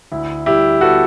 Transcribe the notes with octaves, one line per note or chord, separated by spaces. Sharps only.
D2 E4
G3 E4 G4
B3 F#4 A4